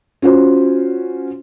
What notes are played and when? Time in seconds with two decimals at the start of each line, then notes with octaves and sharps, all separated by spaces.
0.22 C#4 F4 F#4 C5